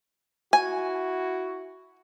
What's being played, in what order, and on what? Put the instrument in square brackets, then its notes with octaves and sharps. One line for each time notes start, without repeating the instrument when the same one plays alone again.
[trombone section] E4 F#4 [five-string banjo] G#5